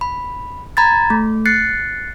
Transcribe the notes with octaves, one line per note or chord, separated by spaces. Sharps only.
B5
A#5 B5 G#6 A6
A3
F#6 A6 C7 C#7